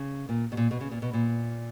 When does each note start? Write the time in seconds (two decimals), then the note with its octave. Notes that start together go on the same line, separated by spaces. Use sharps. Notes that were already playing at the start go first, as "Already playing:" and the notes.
Already playing: C#3
0.29 A#2
0.52 B2
0.57 A#2
0.71 B2
0.81 C#3
0.91 A#2
1.02 B2
1.13 A#2